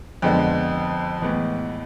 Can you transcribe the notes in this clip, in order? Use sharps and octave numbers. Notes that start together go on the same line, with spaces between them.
F2 D3 G#3 B3
A2 E3 G#3 B3